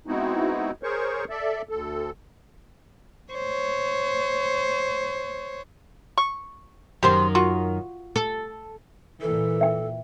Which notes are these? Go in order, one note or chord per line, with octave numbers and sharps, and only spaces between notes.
G#3 B3 C4 D#4 E4 F#4
G#4 A#4 C5 C#5 C#6
A4 D5 E5
D2 A4
C5 C#5
C#6
F#2 D#3 G4 C5 C6
F4 F#4
A4
A#2 E3 A4
E5 G5